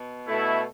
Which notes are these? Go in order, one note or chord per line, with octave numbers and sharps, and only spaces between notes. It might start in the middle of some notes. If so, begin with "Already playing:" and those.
Already playing: B2
B2 A3 E4